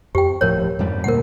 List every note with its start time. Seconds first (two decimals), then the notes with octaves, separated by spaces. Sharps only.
0.15 F2 G4 G5
0.41 D#1 A2 F3 A#4 C#5
0.79 F2 G#2 G3
1.04 D2 A#2 A#3 A#4 F#5